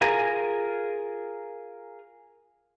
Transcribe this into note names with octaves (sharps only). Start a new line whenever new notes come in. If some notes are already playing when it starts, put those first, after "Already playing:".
F4 G#4 A#4 G#5 A#5